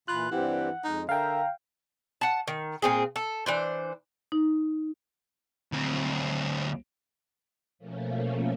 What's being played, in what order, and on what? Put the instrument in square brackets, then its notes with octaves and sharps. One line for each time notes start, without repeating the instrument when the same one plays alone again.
[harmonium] A#2 E3 [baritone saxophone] F4 [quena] B5 [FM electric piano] F#6
[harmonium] G2 C4 G4 [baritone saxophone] E3 [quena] F#5
[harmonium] F2 G#3 [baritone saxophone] D#4
[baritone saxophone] D3 [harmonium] A#4 E5 [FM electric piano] F5 G5 [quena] A#5
[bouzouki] F#5 A5
D#3
A#2 C4 G#4
A4
E3 D4 C5
[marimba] D#4
[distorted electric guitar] D2 C4
[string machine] B2 F3 A3 A#3 C#4